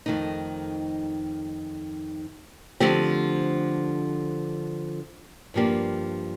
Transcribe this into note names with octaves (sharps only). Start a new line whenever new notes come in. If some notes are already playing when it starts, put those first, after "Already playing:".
F2 D#3 A3 D#4
D3 F3 A3 C4 G4
G2 F3 A#3 D4 G4